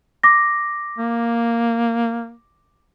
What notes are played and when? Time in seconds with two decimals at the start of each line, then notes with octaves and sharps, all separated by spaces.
0.24 D6 A#6
0.98 A#3